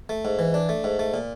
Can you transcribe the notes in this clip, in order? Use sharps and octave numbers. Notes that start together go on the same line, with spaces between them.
A3
G#2
E3
D4
A3
G#2
A3
A#2